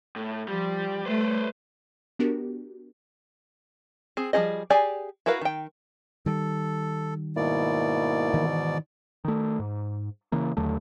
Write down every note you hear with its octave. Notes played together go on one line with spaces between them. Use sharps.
A2
F3 G3
G3 A3 B4 C5
B3 D4 F#4 G4 A#4
C4 G#4
F3 G3 F4 G#4 D#5
G4 G#4 D5 G#5
E4 F#4 A#4 B4 F5
D#3 G5
D#3 G3 A4
G#2 B2 A#3 E4 D5
D#3 E3
D#3 A3
G#2
C#3 E3 A#3
D#2 D3 F#3 A3